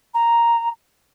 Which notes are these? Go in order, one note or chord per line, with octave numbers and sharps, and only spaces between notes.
A#5